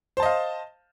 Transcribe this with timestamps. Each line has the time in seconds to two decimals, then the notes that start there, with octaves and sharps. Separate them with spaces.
0.17 C5
0.20 A5
0.23 D#5
0.25 F5